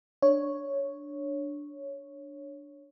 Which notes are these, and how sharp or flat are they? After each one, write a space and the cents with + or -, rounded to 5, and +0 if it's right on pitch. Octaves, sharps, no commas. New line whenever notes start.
D4 +0 C#5 +0